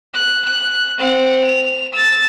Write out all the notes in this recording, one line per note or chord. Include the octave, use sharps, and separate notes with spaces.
F#6
F#6
C4 F#5
F7
E6 A6